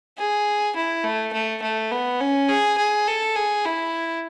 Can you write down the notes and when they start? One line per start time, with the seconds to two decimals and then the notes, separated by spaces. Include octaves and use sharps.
0.18 G#4
0.76 E4
1.04 A3
1.33 A3
1.62 A3
1.91 B3
2.20 C#4
2.49 G#4
2.78 G#4
3.07 A4
3.36 G#4
3.65 E4